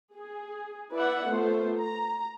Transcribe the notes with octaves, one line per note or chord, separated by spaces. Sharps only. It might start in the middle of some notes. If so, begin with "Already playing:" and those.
G#4
E4 B4 D5 E5 F#5
A3 B3 F4 C5
A#5